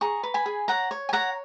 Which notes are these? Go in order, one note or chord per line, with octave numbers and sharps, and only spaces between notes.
G#4 A#5 C#6
B4
G#5 B5
G#4
C#5 F#5 A#5
C#5
G#5
C#5 F#5 A#5